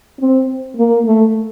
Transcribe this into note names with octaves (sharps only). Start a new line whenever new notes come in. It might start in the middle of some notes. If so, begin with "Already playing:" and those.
C4
A#3
A3